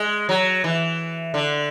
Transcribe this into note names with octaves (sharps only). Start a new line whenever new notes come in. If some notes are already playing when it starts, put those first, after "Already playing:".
Already playing: G#3
F#3
E3
D3